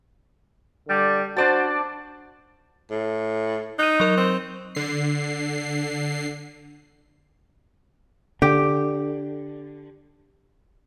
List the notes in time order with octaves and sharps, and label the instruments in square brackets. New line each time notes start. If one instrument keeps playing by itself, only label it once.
[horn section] D3 G3 D5
[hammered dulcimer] D4 D5 A5 [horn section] F#4 C5
[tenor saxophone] A2
[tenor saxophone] D#4 [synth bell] F#6 D#7
[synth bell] F#3 A#4
[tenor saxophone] C4
[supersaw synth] D3 C7
[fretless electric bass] D3 [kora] G4